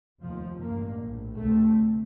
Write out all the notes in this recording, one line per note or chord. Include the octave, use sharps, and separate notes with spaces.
F1 D#2 F3
A1 G2 A#3
A#1 A2
D2 C3 A3